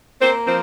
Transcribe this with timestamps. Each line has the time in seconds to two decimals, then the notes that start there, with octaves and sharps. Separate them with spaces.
0.20 A#3 C4 C5
0.45 F3 C4 C5